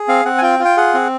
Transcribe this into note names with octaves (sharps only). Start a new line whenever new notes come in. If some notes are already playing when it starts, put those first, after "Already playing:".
Already playing: G#4
C4 F5
C4 F#5
G#5
F4 G5
F4
G5
G#4 F#5
C4